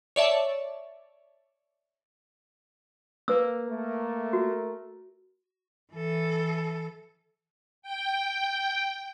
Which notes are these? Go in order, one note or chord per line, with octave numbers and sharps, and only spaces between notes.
C#5 D5 E5 A5
A#3 B4 E6
A3 A#4
F#4
E3 A4
G5